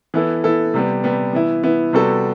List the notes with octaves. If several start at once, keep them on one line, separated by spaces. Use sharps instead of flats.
E3 B3 E4 A4
E3 B3 E4 A4
C3 G3 B3
C3 G3 B3
E3 B3 E4
E3 B3 E4
C3 G3 B3 F#4 A4